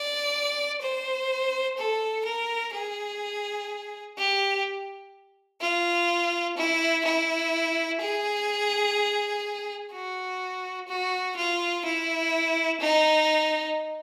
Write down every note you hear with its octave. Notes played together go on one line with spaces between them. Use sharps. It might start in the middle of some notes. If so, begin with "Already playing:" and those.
Already playing: D5
C5
A4
A#4
G#4
G4
F4
E4
E4
G#4
F#4
F#4
F4
E4
D#4